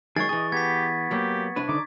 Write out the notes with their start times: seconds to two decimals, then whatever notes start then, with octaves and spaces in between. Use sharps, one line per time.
0.16 D#3 F#3 G#3 G#4 C#6 A6
0.29 E3 G#4 D#5
0.52 B3 G4 G#6 B6
1.11 F#3 A#3 G4
1.56 C2 D4 B4
1.69 D3 D#4 D6